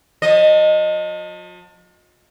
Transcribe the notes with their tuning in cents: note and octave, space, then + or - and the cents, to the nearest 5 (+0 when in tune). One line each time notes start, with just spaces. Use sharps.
F3 +45 D#5 -10